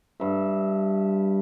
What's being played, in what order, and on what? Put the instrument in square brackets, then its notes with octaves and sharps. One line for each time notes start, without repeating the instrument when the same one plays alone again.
[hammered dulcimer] G2 E5